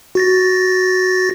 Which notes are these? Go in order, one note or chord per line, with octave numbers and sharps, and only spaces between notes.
F#4 A6 A#6